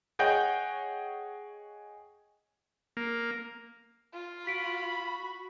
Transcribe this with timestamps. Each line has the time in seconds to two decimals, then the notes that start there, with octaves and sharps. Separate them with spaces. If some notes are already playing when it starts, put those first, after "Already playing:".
0.19 G#4 C#5 D#5 F#5 G5 G6
2.97 A#3
4.14 F4
4.47 F#4 B5 B6 D7